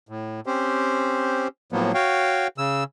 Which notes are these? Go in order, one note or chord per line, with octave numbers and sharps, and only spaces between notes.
A2
C4 C#4 G4 C5
A2 F3 F#3 A#3 B3
F#4 C#5 F5 G5
C#3 E6